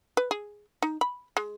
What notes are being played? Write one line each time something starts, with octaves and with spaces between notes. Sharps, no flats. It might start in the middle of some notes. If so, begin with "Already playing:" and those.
B4
G#4
D#4
B5
G#3